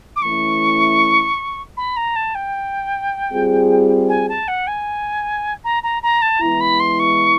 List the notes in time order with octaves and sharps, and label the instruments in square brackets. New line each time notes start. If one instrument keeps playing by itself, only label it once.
[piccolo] D6
[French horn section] E3 A3 C#4 E4 [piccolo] C#6
[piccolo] B5
A#5
A5
G5
[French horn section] G3 C4 F4 G#4
[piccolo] G#5
A5
F#5
G#5
A#5
A#5
A#5
A5
[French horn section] E3 G#3 B3 E4 [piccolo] A#5
[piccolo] B5
C6
C#6